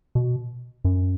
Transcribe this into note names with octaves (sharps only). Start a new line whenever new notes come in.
B2
F#2